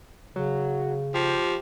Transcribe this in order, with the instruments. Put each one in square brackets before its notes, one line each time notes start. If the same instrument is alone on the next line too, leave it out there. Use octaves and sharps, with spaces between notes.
[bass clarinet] C#3 [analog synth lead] F#3
[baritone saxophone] F3 [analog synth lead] G4